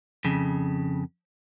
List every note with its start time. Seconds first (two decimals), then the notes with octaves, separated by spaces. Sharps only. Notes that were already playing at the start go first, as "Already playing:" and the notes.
0.25 F2 C#3